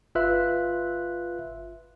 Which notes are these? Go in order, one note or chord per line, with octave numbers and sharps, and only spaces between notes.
G1 F4 B4 E5 F#6